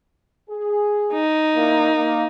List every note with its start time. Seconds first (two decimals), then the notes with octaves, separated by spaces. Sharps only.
0.50 G#4
1.14 D#4
1.55 A#2 A#3 E4
1.94 A#3